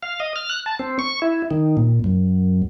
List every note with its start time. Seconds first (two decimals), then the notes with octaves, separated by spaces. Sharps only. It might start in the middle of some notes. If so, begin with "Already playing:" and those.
0.03 F5
0.20 D#5
0.36 F6
0.50 F#6
0.66 A5
0.79 C4
0.99 C#6
1.22 E4
1.51 D#3
1.77 A#2
2.04 F#2